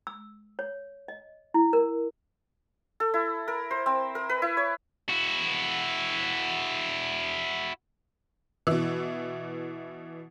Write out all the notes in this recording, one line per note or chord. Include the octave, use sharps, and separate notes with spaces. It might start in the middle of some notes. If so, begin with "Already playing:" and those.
E6
C#5
D#5
E4
A#4
A4
E4
A#4
C5
C4
A#4
B4
E4
C#5
E4 F#4
B2 E3